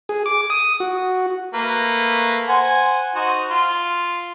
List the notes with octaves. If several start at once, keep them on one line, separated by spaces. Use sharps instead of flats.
G#4
D6
D#6
F#4
A3 A#3 B4
C5 F#5 G#5
D#4 F#4 C5
F4